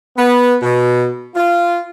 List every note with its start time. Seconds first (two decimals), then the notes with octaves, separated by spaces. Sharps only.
0.16 B3
0.62 B2
1.35 F4